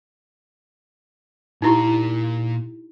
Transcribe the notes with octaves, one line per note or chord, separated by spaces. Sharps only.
A#2 D#4 E4 G4 C6